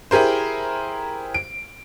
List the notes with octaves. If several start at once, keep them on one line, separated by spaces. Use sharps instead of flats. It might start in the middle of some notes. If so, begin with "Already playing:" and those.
E4 G4 G#4 A#4 C5
D7